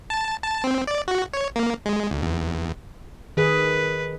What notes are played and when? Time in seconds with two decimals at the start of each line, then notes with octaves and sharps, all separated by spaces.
0.10 A5
0.44 A5
0.64 C4
0.87 D5
1.08 F#4
1.34 C#5
1.56 A#3
1.86 G#3
2.11 D2
2.23 E2
3.37 D#3 G#4 B4